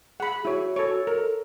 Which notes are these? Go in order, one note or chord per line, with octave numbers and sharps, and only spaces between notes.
G#4 F#5 B5
E4 F#4 C#5
A4 C#5
A4 A#4